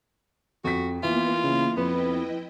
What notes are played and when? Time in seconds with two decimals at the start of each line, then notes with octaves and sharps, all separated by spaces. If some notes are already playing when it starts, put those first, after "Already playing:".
0.64 F2 F#4 B6
1.03 E3 A#3 B3 E4 F4
1.44 C#3 A#3
1.77 F2 B3 E4 B4 D#5 G5